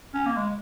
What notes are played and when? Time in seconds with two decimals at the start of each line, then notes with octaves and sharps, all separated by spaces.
0.14 C#4
0.26 A#3
0.37 G#3